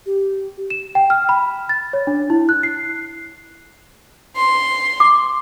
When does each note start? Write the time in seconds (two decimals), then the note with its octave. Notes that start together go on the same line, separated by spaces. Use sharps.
0.06 G4
0.70 E7
0.95 G5
1.10 F6
1.29 B5
1.69 A6
1.93 C#5
2.07 D4
2.30 E4
2.49 F#6
2.63 C7
4.36 C6
5.00 D6